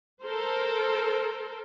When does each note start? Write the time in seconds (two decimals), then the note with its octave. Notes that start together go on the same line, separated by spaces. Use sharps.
0.22 A4 A#4 C5